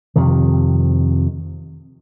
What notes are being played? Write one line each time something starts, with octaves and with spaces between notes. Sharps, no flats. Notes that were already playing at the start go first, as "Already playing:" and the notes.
F2 C3 D#3